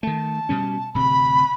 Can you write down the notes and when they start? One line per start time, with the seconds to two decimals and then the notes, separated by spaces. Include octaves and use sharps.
0.03 D#3 A3 A5
0.49 B2 G3 C#4
0.94 D1 C3 B5